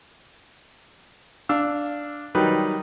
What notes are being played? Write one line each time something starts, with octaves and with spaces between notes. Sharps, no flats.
D4 F5 E6
D#3 F#3 G3 D#4 B4